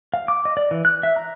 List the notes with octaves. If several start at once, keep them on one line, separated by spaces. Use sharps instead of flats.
F5
D6
D#5
D5
E3
F#6
E5
A#5